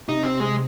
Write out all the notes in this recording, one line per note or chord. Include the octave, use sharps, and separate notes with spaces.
C3 D#4
C4
G#3